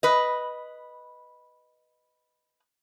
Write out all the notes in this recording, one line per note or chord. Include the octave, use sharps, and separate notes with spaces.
B4 D#5